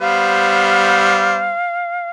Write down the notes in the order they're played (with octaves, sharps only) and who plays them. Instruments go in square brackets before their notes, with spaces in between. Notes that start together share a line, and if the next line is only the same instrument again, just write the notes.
[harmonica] G3 B3 C5 [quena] F5